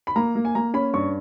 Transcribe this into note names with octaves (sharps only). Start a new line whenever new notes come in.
B5
A#3 A#5
A#3
G#5
A#3 A#5
C#4 B5
G2 C#6